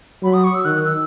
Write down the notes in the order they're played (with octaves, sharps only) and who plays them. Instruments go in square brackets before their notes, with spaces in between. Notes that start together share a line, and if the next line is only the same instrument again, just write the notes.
[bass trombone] F#3 [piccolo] B5
[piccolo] D#6
C#6
E6
[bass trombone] D#3 [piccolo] F#6
[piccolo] E6